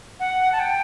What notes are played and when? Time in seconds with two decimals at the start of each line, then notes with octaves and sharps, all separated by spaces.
0.20 F#5
0.52 A5
0.60 G5